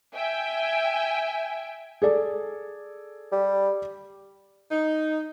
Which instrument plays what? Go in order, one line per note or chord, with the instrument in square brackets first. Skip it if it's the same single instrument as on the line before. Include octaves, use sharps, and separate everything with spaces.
[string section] E5 G5 G#5
[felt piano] G#4 A4 D5
[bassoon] G3
[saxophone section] D#4